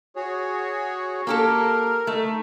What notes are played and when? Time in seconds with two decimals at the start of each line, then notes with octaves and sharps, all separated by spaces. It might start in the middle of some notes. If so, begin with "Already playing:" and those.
0.16 F#4 G#4 C#5
1.27 A#3 G4 A4 A#4
2.07 A3 D#4